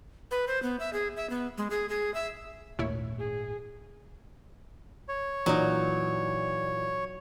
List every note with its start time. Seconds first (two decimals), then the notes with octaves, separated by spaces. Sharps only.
0.31 B4
0.47 C5
0.63 B3
0.80 E5
0.93 G#4
1.17 E5
1.30 B3
1.58 G#3
1.70 G#4
1.89 G#4
2.14 E5
2.79 G#1 D#2 A#2 A3 E4 C#5
3.19 G#4
5.09 C#5
5.46 A#2 E3 F#3 D#4 D5